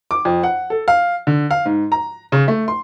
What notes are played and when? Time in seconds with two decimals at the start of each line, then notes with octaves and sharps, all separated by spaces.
0.11 D6
0.25 F2
0.43 F#5
0.70 A4
0.88 F5
1.27 D3
1.51 F5
1.66 G#2
1.92 A#5
2.32 C#3
2.48 A3
2.68 C6